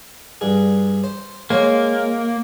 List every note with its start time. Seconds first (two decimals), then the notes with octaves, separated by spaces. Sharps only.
0.41 G2 G#4
1.04 C5
1.50 G#3 A#3 C5 C#5